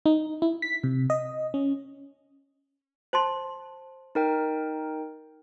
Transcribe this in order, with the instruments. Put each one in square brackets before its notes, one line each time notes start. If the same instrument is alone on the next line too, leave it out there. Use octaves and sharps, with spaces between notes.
[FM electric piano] D#4
E4
B6
C3
D#5
C#4
[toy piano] C5 A5 C6
[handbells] D#4 A#4 G5